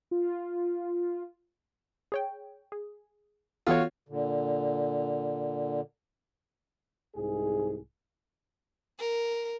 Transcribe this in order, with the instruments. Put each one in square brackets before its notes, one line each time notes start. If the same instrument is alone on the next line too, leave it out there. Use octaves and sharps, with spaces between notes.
[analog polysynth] F4
[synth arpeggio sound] G#4 C#5 G5
G#4
[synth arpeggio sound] E3 B3 A4 [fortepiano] F4 F#4 C#5
[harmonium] A#2 D3
[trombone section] C2 G#2 G#4
[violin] A#4